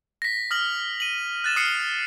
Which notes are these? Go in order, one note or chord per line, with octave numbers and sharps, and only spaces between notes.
A#6 B6
D#6 F6 A#6 F#7
D#7 F#7
F#6 A6 E7
D#6 F6 C7 C#7